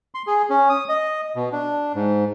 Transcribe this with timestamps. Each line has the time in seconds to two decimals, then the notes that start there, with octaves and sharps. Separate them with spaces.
0.15 C6
0.27 G#4
0.50 C#4
0.69 D#6
0.89 D#5
1.36 B2
1.52 D4
1.95 G#2